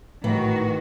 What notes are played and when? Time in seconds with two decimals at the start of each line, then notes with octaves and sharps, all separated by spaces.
0.24 A2 D#3 E3 F#4